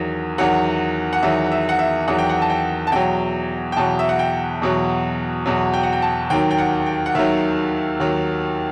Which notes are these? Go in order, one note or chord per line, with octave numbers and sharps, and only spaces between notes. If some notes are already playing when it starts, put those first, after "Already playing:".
Already playing: E2 D#3 F#3
E2 D#3 F#3 F#5
F#5
E2 D#3 F#3 E5
E5
F#5
E5
E2 D#3 F#3 F#5
G5
F#5
A5
G5
A5
E2 B2 F#3 G5
G5
E2 B2 F#3 A5
E5
F#5
G5
E2 B2 F#3
E2 B2 F#3
G5
F#5
G5
A5
D#2 D#3 F#3 G5
G5
F#5
G5
F#5
D#2 D#3 F#3 E5
D#2 D#3 F#3